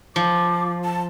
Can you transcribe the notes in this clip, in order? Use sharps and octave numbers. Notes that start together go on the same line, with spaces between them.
F3 D6
A5